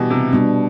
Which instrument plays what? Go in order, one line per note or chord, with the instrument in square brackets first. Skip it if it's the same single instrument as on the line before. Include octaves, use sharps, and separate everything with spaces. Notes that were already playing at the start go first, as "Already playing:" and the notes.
Already playing: [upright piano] B2 E3 G3
C3
[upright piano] B2 [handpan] G3 B3 D4